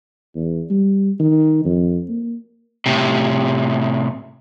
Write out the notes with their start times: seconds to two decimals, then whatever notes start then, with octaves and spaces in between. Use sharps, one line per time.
0.35 E2
0.70 G3
1.20 D#3
1.65 F2
2.09 A#3
2.86 A2 C3